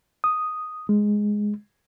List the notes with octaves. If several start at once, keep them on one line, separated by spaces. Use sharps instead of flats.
D#6
G#3